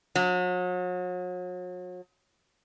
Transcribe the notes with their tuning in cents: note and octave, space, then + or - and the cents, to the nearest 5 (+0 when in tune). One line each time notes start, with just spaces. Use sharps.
F#3 -40